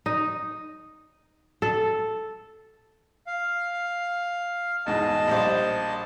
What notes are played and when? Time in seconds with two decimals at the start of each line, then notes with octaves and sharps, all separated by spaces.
0.06 D#4
1.62 A4
3.27 F5
4.86 E2 G#2 B2 D#5 A5
5.27 A#1 G3 C5